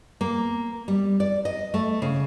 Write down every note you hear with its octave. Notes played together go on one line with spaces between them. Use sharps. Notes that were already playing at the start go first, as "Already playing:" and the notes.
A#3
G3
D5
D#5
A3
C#3